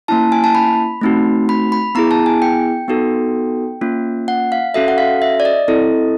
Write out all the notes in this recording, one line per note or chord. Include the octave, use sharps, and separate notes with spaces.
A#3 C#4 E4 A5
G#5
A5
B5
A3 C4 D#4 F#4
B5
B5
B3 E4 G#4 A#5
A5
G#5
G5
B3 D#4 F#4 A4
A#3 C#4 F4
F#5
F5
C#4 F#4 A4 E5
F#5
F5
E5
D5
D#5
C4 E4 A4